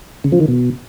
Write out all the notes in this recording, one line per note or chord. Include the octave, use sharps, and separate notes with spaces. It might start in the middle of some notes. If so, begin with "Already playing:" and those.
C#3
F3
D#3
B2